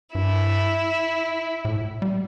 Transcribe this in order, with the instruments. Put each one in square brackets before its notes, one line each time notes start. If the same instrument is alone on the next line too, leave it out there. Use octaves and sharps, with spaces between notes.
[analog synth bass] G2 [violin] E4
[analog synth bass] A2
G3